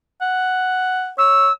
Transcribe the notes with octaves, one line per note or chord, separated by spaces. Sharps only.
F#5
C#5 E6